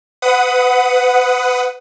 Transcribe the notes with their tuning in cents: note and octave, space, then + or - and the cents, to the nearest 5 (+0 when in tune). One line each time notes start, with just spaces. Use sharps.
B4 +25 F#5 +0 D#6 +0